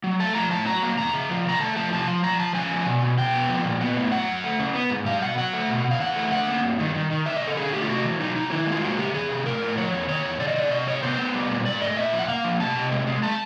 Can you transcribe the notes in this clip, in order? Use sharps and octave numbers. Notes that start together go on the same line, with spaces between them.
F#3
A3 A5
F3 A#5
A2 A5
F#3 A#5
A#3
E2 A#5
C#3
F3
C#3 A#5
A3 A5
F3 A5
C3 A5
F3
F3 A#5
F3 A5
C#3 G#5
F3
B2
B2
B2 G5
B3
F3
A#2
B3
A2
F#3 F#5
F#2
A3
C#3
B3
G#2
G3 F5
B2 F#5
F#3 F#5
A3
B2
B2
F5
E3 F#5
A3
D3 F#5
A#3
G2
D#3
D#3
D#3
C#3 E5
D#5
C#3
A4
D3 G#4
A3 G4
F4
C3 F#4
E3
F#3 D#4
F#3 D#4
D#3 E4
G#3
F4
A#3 F#4
C#3 G4
E3 G#4
C3
A2 A#4
A2
F3 C#5
E2
D#3 C#5
E2
C#3 D5
D#5
C#3 D5
C3 D#5
C3 C#5
B3 C5
B3
G3
A#2
G#2 D5
A3 D#5
A#2 E5
F3
F#5
A#3 F5
F3
C3 A5
C3
G#3
G#3
G#3 A5